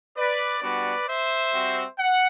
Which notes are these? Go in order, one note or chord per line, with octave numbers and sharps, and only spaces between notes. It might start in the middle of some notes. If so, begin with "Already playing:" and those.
B4 D5
G3 B3 D4 F#4 B4 D5
C5 E5
G3 C4 F#4
F#5